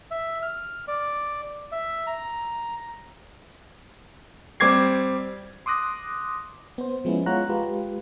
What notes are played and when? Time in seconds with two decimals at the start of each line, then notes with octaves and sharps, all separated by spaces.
0.11 E5
0.42 F6
0.88 D5
1.72 E5
2.07 A#5
4.60 G3 C4 D6 G#6 C7
5.66 C6 D6 D#6 F#6 A#6
6.78 B3 C5
7.05 F3 G#3 B3 C#4 E4
7.26 G#3 F4 C#5 F#5 A#5 F#6
7.49 G#3 F4 G4 B4